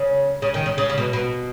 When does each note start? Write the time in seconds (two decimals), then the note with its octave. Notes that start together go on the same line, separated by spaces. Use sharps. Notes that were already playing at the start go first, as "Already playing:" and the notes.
Already playing: C#3
0.42 C#3
0.54 D#3
0.66 C#3
0.78 C#3
0.89 C#3
0.98 B2
1.13 B2